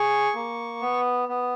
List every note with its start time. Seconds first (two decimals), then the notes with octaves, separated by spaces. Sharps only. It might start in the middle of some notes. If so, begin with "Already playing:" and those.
Already playing: G#4 C#6
0.35 A#3
0.82 B3
1.29 B3